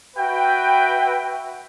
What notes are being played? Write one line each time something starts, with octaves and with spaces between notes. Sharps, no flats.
F#4 B4 E5 G5